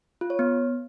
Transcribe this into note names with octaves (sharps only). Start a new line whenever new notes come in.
F4
C#5
B3